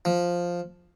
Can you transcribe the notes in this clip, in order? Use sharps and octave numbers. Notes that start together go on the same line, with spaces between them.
F3